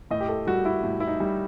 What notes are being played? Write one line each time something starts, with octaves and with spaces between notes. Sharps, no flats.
A2 D#5
G4
A4
G3 F#4
E4
A2
E4
D#4
G3